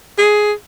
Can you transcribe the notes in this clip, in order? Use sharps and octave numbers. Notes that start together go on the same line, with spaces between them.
G#4